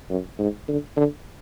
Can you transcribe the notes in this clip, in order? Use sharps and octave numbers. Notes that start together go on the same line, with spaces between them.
F#2
G#2
D3
D3